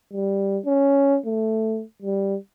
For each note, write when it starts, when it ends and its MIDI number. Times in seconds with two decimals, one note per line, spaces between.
0.13 0.58 55
0.66 1.18 61
1.26 1.83 57
2.02 2.36 55